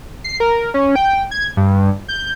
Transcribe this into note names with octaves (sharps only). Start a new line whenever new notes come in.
C7
A#4
C#4
G5
G#6
G2
G6